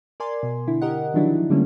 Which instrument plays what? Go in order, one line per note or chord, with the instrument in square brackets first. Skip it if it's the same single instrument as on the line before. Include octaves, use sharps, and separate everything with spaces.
[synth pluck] A#4 D5 G#5 C6
B2
D3 E4
G4 A#4 D#5 F#5
D#3 F3 F#3 D4 E4
D3 G3 A3 A#3 C#4